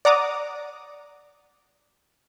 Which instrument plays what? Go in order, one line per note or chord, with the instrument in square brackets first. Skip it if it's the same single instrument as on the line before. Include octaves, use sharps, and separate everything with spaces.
[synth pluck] D5 F#5 A#5 D6 D#6